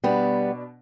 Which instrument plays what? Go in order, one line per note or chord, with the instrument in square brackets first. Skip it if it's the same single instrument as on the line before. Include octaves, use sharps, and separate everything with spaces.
[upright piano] B2 D4 [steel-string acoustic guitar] G3 B3